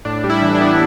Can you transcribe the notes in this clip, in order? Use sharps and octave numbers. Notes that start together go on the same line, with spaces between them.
A2 D4
G3
E4
E3
D4
B3